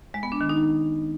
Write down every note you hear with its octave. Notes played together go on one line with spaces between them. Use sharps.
G#3
B3
D4
D#3
D#4